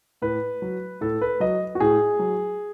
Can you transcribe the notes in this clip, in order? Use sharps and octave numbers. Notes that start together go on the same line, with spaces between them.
A2 B4
F#3
A2 A4
B4
F#3 D#5
F#4
A2 G#4
F#3